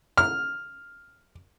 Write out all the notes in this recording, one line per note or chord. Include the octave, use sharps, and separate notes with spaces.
F6